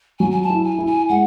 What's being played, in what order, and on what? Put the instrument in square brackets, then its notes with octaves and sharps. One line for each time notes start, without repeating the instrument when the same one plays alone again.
[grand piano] F#3 [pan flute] G#5
[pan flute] G#5
A5
[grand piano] E4
[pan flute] G#5
[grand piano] E4
[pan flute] G#5
[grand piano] G#3 [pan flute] F#5